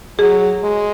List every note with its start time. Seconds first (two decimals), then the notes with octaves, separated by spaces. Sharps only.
0.19 F#3 G#4
0.63 G#3